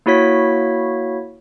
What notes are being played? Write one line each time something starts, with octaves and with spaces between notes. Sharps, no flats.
A#3 E4 F#4 C#5 B6